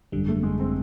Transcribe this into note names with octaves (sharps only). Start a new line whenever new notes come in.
G#1 F#2 D3 G3
A3
G#3
C4